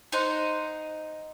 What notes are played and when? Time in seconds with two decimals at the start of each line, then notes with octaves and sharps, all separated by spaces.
0.12 D#4 C5 D#5 F#5